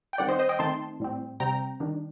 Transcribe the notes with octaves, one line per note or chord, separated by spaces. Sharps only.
G5
D#3 G3 C4 D5 F#5
C5 D#5
C5 D#5
D#5 G5
D#3 A3 C4 D#4 A5 C6
A2 G3 C4
C3 G3 C4 G5 A#5
D#3 G3 D4